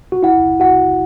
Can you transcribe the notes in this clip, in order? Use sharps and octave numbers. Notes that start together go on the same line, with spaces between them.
F#4
E4 F#5
F#4 F#5